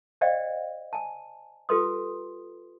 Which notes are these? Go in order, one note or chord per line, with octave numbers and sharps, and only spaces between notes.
C5 D5 D#5 F5 G5
G#5 A5
F4 G4 A4 B4 C6 D#6